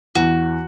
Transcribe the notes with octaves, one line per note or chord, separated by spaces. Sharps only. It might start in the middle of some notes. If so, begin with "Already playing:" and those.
E2 E3 F#4